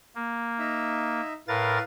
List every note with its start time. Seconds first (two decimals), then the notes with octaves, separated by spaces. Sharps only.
0.15 A#3
0.59 D#4 E5
1.48 A2 A#4 B4 F5 A6